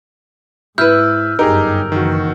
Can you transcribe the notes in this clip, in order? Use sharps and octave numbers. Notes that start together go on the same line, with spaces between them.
G#2 E4 B4 E6 F6 G6
G1 F#2 D#4 G4 G#4 A#4
F#1 D#3 E3 F#4